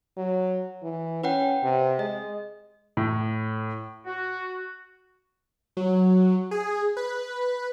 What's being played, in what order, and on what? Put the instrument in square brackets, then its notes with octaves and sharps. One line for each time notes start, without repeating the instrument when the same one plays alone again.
[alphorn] F#3
E3
[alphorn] C#4 [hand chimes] B4 F#5 G5
[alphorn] C3
[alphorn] G#3 [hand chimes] D#5
[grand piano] A2
[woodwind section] F#4
[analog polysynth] F#3
G#4
B4